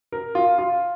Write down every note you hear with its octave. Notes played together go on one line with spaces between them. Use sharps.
A#4
F4
F4